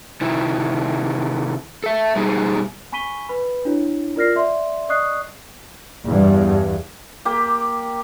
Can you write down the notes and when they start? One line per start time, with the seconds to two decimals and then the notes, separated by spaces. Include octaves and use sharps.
0.21 C3 D#3 E4
1.84 A4 E5
2.16 B2 G3 D#4 G#4
2.92 G#5 B5 C#6 B6 D#7 G7
3.29 B4 B5
3.65 D4 E4 F#4 C#5
4.16 F4 A#4 D5 F6 A#6 C7
4.35 D5 E5 C6
4.89 D5 D#5 C#6 D#6 F#6 C7
6.05 E2 G2
7.25 A#3 G4